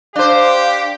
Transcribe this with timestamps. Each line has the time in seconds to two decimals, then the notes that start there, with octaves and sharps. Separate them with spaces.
0.16 D4 G4 C5 F5